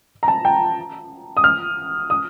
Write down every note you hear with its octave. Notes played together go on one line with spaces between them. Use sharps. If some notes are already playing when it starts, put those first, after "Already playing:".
A#5
A5
G5
D#6
F6
D#6